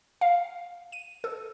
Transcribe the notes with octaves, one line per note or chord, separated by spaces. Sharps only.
F5
D#7
A4